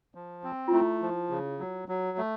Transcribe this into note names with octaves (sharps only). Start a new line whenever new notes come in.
F3
C4
F4
A3 E4
F3
C#3
F#3
F#3
A3